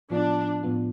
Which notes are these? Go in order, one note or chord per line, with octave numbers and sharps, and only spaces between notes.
A2 F3 B3 D4 F4
A2 F3 B3 F4